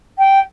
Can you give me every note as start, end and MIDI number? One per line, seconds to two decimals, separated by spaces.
0.18 0.39 79